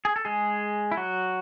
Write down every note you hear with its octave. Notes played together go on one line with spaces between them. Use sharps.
G#4
A4
G#3 G#4
E4
F#3 F#4